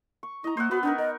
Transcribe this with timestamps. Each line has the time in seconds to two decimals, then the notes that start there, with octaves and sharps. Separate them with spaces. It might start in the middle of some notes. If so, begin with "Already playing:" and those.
0.23 C#6
0.44 E4 D#5 A#5
0.57 A#3 C5 E5 F#5
0.71 B3 F#4 B4
0.83 B3 D4 D#4 A#4
0.98 A#4 D#5